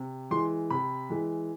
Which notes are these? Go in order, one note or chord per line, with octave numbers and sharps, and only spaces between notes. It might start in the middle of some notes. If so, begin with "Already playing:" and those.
Already playing: C3
E3 G#3 C6
C3 B5
E3 G#3